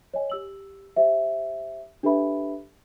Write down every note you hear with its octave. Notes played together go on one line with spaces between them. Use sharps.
C#5 D#5 G#5
G4 E6 F#7
G4 C5 E5
D4 G4 A4 B4 E5 B5